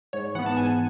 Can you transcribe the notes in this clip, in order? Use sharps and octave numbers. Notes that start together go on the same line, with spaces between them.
G#2 C#5
E3 B3 F#5
A5
G#2 G#5